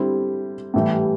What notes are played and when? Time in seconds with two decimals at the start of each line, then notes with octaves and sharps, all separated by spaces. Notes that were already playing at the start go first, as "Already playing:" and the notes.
Already playing: D3 G3 C4 E4
0.74 A2 E3 G3